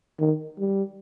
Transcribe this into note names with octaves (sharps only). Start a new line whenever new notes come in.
D#3
G3